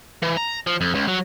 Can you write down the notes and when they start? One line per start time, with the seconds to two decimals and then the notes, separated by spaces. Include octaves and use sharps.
0.22 E3
0.37 A#5
0.67 F3
0.81 F2
0.95 C#2
1.08 F#3